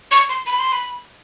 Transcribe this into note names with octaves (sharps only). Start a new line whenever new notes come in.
C#6
C6
B5
C6
B5